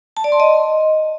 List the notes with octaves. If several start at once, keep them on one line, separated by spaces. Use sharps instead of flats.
A5
D5
C6
D#5